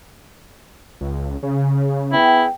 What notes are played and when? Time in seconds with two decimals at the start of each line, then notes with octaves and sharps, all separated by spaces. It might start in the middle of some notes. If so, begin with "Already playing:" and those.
1.01 C#2
1.43 C#3
2.12 B3 E4 G#4 G5